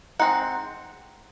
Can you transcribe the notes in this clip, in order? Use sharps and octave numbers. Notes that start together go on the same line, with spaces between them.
G#3 C4 D#4 F#5